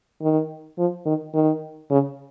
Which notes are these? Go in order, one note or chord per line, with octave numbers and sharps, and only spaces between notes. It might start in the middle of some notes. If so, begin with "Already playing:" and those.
D#3
F3
D#3
D#3
C#3